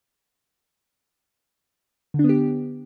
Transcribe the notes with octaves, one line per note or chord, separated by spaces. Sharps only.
D3
D4
B3
G4